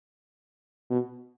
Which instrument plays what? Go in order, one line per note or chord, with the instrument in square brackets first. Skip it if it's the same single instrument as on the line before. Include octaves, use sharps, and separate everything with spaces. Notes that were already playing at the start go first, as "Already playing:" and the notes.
[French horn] B2